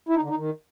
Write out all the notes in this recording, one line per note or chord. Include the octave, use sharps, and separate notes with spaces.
E4
D#4
D3
D#4
D#3